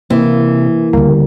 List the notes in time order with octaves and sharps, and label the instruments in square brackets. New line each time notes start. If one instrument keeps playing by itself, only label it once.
[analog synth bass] C3 [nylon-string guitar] E3 [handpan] A#3
[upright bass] D2 [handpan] C#3 G3 [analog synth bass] A#3